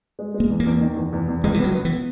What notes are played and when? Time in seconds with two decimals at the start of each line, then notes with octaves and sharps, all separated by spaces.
0.19 G#3
0.34 G#3
0.40 A#3
0.50 E2
0.60 A#3
0.66 E2
0.81 D#3
0.96 E2
1.13 E2
1.28 E2
1.44 C#2 G#3
1.54 E3
1.59 F#3 B3
1.74 B3
1.85 E3